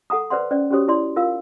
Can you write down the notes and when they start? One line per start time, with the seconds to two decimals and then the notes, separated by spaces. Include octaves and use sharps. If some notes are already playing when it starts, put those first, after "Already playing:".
0.10 A4 F#5 A#5 D#6
0.30 B4 C5 D5 F#5 C6
0.51 C#4 C5 D5
0.71 C#4 F#4 G4 C5 C#5 D#6
0.88 E4 D5 C6
1.16 F4 A#4 F5 E6